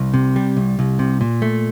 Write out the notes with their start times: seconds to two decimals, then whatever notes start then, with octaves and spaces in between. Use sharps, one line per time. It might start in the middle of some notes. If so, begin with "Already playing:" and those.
Already playing: C2
0.14 C3
0.36 G3
0.57 C2
0.79 C2
0.99 C3
1.21 A#2
1.42 A3